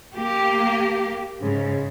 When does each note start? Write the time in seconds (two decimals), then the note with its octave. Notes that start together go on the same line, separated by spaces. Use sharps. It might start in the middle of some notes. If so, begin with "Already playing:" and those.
0.16 A#3 G4
1.40 G#2 C#3